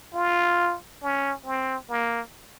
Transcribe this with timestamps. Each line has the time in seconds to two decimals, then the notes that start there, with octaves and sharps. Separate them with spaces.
0.14 F4
1.03 C#4
1.46 C4
1.90 A#3